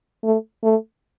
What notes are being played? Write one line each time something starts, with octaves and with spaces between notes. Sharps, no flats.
A3
A3